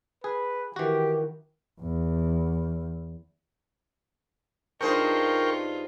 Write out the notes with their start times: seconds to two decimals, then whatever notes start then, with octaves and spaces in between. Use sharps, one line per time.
0.24 G#4 B4
0.76 D#3 E3 F#4 G4
1.80 E2
4.81 G2 D#4 F4 G#4 A#4 C5 G5 C#6